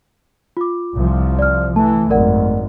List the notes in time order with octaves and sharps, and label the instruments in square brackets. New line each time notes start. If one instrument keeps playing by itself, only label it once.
[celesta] F4 D6
[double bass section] C2 F3
[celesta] D5 F6
[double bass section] E3 [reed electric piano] A3 [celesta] A5
[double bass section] G#1 F#2 [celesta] A#4 D5 F#5